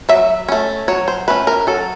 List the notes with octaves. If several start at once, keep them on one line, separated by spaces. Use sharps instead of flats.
F#3 E5
A3 C#4
F#3 C#5
C5
A3 C#4 B4
A#4
F#3 A4